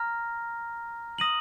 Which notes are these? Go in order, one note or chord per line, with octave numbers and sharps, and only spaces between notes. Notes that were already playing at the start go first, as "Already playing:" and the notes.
Already playing: A#5 F6 A#6
D#6 A#6 D#7 F#7